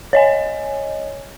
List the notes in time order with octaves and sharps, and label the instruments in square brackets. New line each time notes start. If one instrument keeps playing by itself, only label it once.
[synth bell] C#5 D#5 G#5